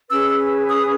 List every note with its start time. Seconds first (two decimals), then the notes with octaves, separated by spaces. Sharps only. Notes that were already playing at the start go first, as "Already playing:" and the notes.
0.09 C#4 G#4 B4 E6
0.69 D#6